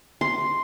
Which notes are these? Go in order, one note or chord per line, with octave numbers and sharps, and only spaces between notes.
C6